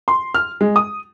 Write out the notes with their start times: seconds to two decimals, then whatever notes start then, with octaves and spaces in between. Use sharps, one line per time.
0.08 C6
0.34 F6
0.61 G#3
0.76 D#6